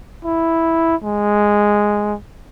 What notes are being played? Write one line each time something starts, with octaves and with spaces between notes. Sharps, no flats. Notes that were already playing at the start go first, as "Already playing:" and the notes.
E4
G#3